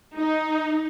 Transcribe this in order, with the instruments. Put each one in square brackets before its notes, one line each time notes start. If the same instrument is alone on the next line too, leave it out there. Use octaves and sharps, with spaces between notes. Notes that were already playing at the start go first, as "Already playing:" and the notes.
[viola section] D#4